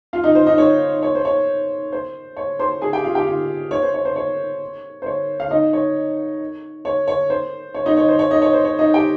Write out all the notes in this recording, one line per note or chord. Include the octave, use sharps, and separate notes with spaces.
F4 F5
D#4 D#5
C5
D#4 D#5
C#5
C#5
C5
C#5
C5
C#5
C5 C6
G#4 G#5
G4 G5
F4 F5
G4 G5
F4 F5
C#5
C5
C#5
C5
C#5
C5
C#5
F5
D#4 D#5
C#5
C#5
C#5
C5
C#5
D#4 D#5
C#5
C5
C#5
D#4 D#5
C#5
C5
C#5
D#4 D#5
G4 G5